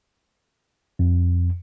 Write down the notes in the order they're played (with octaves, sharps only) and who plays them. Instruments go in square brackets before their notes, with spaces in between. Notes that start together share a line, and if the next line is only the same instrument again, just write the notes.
[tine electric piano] F2